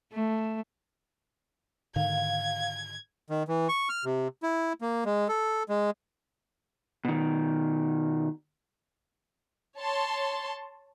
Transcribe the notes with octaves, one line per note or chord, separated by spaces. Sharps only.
A3
G#2 D3 D#3 F5 G#6
D#3
E3
C#6
F6
C3
E4
A#3
G#3
A4
G#3
B2 D#3
C#5 A5 C6